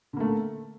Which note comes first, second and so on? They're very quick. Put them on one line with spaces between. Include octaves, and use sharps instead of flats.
D3 A#3 A3